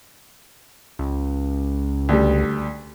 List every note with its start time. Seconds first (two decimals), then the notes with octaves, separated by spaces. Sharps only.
0.99 C#2
2.09 D2 G3